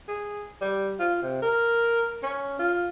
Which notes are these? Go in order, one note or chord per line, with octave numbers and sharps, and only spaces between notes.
G#4
G3
F4
C3
A#4
C#4
F4